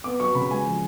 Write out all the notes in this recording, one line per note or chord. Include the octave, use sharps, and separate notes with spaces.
B3 D6
F#3 C#6
C#3 B5
G#3 G#5
F3